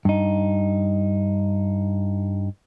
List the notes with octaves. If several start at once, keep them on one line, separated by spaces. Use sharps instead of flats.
G2 D#4